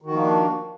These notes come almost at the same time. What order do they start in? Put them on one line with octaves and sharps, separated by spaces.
D#3 F#4 F3 A#3 D4